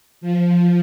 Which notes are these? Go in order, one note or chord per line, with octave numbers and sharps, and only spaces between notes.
F3